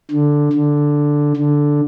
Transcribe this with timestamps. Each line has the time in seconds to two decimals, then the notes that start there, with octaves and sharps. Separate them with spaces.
0.11 D3
0.53 D3
1.36 D3